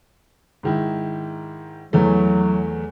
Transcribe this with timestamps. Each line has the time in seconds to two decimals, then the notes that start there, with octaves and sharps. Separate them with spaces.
0.63 G#2 D#3 E4
1.93 E2 E3 F#3 A3